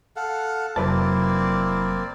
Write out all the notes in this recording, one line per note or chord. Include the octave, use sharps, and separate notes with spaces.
A4 F5 F#5
F1 F#3 A#3 C4 E4 B4 D5 A5